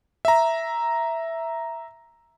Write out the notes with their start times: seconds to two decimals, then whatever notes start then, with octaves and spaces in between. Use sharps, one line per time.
0.25 E5 A#5